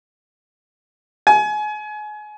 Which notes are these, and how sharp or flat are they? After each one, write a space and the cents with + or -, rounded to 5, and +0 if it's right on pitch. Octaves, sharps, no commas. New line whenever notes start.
G#5 +30